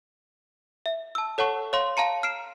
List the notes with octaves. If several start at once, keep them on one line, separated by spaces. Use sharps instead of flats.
E5
A5 E6
A4 C#5 F#5 A5 C#6
C#5 F5 C6
F5 A5 A#5 C#7
F6 C7 D7 E7